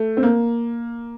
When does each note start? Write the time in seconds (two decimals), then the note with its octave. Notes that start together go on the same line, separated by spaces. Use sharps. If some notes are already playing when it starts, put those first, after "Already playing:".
Already playing: A3
0.17 C4
0.23 A#3